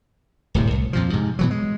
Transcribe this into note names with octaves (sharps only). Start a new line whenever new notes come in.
D1 A2 C3
C2
F2 A#2 F3
G#2 C3
B2 E3 F#3
G#3